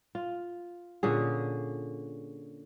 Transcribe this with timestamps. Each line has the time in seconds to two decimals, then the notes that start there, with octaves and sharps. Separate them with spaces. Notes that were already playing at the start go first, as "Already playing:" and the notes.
0.15 F4
1.03 A#2 D3 C#4 G#4